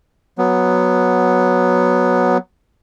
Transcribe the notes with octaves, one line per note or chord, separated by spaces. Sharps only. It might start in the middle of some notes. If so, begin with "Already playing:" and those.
F#3 B3